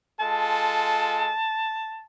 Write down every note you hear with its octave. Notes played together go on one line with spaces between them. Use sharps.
G#3 F4 A4 A5